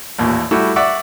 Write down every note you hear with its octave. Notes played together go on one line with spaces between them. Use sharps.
A1 D#2 A#2
G3 A3 E4 F#4
D5 E5 F#5 C#6 D6